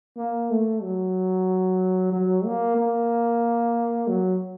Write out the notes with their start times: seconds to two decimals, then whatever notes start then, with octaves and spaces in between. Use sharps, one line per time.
0.17 A#3
0.50 A3
0.82 F#3
2.13 F#3
2.45 A#3
2.77 A#3
4.07 F#3